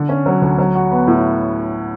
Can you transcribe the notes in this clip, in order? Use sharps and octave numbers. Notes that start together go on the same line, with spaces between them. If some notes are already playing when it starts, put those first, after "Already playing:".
Already playing: D3
C#4
F#3
D2
F#3
F#4
B3
A2